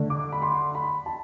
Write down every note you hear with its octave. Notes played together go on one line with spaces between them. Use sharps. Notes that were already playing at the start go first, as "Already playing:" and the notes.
Already playing: D3 A3 D4
D6
B5
C6
B5
A5